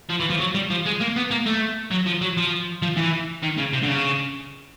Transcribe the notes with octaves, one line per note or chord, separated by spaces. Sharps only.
F3
E3
F3
F#3
G3
F3
G#3
A#3
B3
A#3
A3
F#3
F3
F#3
F3
F3
E3
D#3
C#3
C3
D3
C#3